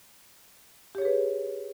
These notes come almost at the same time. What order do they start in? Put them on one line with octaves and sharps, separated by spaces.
G4 C#5 G#4 B4